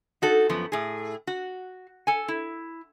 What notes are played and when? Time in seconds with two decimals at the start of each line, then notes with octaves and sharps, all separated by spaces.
0.22 D#4 F#4 A4
0.49 F#2 F3 B3
0.72 A2 G#4
1.27 F#4
2.07 A4 G#5
2.28 E4